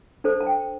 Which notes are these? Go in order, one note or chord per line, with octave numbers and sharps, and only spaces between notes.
D4 A4 C5 A5
A5
G5